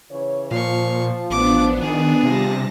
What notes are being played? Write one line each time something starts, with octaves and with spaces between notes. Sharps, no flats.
C#3 E3 C#5
A#2 F3 F5 C#6
A1 B3 D4 D6
D#3 G#4
C3 G3 F4 G4 A5 A#6